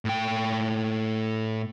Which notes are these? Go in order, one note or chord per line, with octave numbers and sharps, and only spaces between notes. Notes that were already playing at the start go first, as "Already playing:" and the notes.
A2 G5